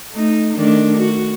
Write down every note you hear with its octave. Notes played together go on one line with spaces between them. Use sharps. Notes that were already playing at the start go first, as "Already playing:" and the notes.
A3 D#4
D#3 A3 D4
F#4